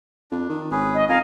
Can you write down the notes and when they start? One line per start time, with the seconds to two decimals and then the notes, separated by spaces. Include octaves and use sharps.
0.31 F2 D4
0.49 D#3
0.71 G#1 C#4 G#4 B4
0.94 D#5
1.09 F2 A#4 D#5 F5 G#5